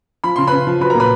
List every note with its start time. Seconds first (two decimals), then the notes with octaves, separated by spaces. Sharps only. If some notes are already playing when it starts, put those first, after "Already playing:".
0.24 F3 B5
0.36 C#3 C6
0.47 C#3 B4 B5
0.67 F3
0.80 F#3 B4 B5
0.90 A#4 A#5
0.95 A#2 B4 B5